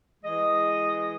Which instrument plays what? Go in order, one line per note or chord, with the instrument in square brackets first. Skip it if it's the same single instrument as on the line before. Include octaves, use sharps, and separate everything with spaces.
[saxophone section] E3 G#3 D#5